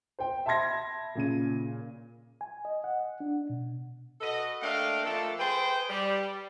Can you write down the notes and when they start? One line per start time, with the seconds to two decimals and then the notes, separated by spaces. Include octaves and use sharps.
0.19 C5 G5
0.46 E5 A5 B5 C6 G#6 A#6
1.15 A#2 C#3 D#7
2.41 G#5
2.65 D#5
2.84 F#5
3.20 D4
3.50 B2
4.21 F#4 A4 B4 D#5
4.61 A3 A#3 D4 D#5 F5 G5
5.05 F3 A3 A#3 C4 A4
5.39 G#4 B4 C5 G5
5.89 G3